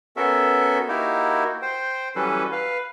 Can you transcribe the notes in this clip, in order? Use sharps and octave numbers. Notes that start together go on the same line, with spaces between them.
B3 C#4 F#4 A4 A#4 E5
A#3 D#4 E4 F#4 G4 A#4
C5 G5
E3 F#3 G3 C#4 A4 B4
B4 F5